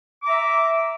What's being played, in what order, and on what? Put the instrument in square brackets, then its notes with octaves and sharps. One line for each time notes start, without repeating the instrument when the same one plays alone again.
[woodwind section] D6
A#5
E5